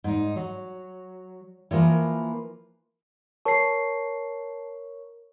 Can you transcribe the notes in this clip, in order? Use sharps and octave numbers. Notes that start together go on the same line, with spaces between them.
G#2 D#4
F#3
E3 F3 A#3 A#4 B4
A#4 C#5 A5 C#6 C7